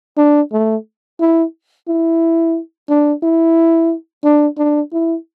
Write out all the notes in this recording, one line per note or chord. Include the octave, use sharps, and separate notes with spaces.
D4
A3
E4
E4
D4
E4
D4
D4
E4